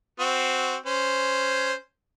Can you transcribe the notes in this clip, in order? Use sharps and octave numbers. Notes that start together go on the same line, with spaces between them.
C4 F#4
C#4 C5